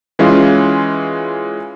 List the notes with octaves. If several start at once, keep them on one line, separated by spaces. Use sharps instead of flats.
E3 G#3 C#4 E4 F4